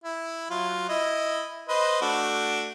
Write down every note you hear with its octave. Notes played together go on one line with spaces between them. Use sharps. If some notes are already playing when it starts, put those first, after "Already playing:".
E4
F#3 F4
E4 D#5
B4 C5 D#5
A3 D4 F#4